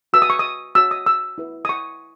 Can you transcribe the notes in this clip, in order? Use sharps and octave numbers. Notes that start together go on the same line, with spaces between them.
F#4 B4 E6
D#6
C#6
D#6
F#4 C#5 E6
D#6
E6
E4 B4
D#6
C#6